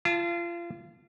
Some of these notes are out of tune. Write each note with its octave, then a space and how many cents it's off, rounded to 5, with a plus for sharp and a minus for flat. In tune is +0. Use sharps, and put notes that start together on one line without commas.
F4 -30 A5 +0